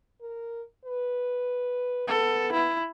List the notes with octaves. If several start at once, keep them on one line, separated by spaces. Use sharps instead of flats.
A#4
B4
B3 A4
E4